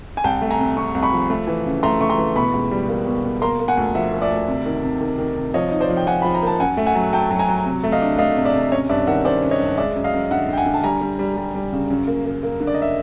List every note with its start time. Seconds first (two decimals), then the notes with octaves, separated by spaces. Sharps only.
0.17 G#5
0.24 C2 G5 A5
0.42 A3
0.51 G#5 A#5
0.59 C3
0.77 C3 C#6
0.95 C2
1.03 B5 C#6
1.12 F3
1.30 A3
1.47 E3
1.66 C#3
1.83 A3 A#5 C6
2.00 A3 C#6
2.10 A#5 C6
2.18 E3
2.36 B2 B5 C#6
2.53 C#2
2.71 G3
2.89 A#3
3.07 B2
3.24 B2
3.42 A#3 A#5 C6
3.60 A#3
3.68 F#5 G#5
3.77 D2
3.95 F3 E5 F#5
4.13 A#3
4.22 D5 E5
4.30 D2
4.48 C3
4.66 D#3
4.84 C3
5.01 D#3
5.18 D#3
5.36 C3
5.54 F3 C#5 D#5
5.71 D#4
5.80 C5 D5
5.90 F3
5.97 G5
6.07 F3 F#5 G#5
6.22 F3 B5
6.35 A#5
6.42 A#3 A5
6.60 F#2 F#5 G#5
6.77 A3
6.86 F#5 G#5
6.95 F#3
7.13 F#3 G5 A5
7.31 F#3
7.39 G#5 A#5
7.48 F#3
7.65 C3
7.83 A3
7.92 D#5 F5
8.02 D4
8.18 A3 D#5 F5
8.36 C3
8.45 D5 E5
8.54 C3
8.72 C#4 C#5 D#5
8.89 G2 D5 E5
9.07 D#3 E5 F#5
9.25 C#4 C5 D5
9.42 C#4
9.51 C#5 D#5
9.60 G2
9.78 G#3 D5 E5
9.96 F#2
10.04 D#5 F5
10.13 F#2
10.31 D3 E5 F#5
10.48 D3 G5
10.57 F#5 G#5
10.66 D3
10.74 A5
10.84 G3 G#5 A#5
11.01 G3
11.19 G3
11.37 G3
11.55 G3
11.72 C#3
11.90 F#2
12.07 A#3
12.25 A#3
12.43 A#3
12.60 D3
12.67 D5
12.74 D#5
12.82 E5